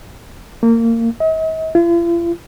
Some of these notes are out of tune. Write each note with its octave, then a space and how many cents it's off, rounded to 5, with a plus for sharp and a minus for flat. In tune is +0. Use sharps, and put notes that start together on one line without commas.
A#3 -25
D#5 +45
F4 -45